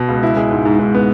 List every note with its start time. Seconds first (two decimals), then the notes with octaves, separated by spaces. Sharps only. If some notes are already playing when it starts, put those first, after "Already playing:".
Already playing: B2
0.08 C#2
0.23 E4
0.36 G#3
0.51 G#2
0.65 G#2
0.79 G#2
0.94 B3